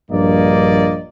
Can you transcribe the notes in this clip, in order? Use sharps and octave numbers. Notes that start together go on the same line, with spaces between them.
A#1 G2 A#3 D5 D#5